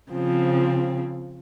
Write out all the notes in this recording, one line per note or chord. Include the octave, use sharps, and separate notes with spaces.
C#3 F3 C4